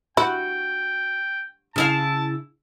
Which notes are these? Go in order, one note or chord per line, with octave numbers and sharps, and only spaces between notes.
E4 F#4 G5
C#3 E4 F5 A5